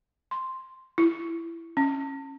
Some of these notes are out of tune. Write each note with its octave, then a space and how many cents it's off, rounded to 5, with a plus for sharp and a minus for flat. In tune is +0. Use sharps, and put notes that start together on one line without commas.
C6 +0
E4 +15
C#4 -20